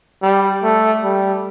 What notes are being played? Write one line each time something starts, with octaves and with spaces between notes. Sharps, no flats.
G3
A3
G3